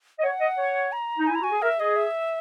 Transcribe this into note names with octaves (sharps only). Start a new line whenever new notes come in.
D#5
C#5 F#5
D#5
C#5
A#5
D#4
E4 G#5
A#5
F#4 G#5
G#4
A#4 E5
G#4 D#5
E5